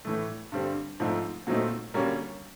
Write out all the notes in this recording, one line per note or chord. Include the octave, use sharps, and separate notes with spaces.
A2 E3 A3
G2 D3 G3 C4
G#2 F3 A3 C4
A#2 F#3 A3 C4 D#4
F#2 D3 G3 A#3 C#4